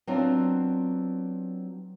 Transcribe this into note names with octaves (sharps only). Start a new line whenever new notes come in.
F#3 B3 C4 D4 F4